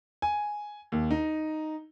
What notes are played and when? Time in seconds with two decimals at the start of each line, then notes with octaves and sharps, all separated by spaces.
0.22 G#5
0.92 D#2
1.11 D#4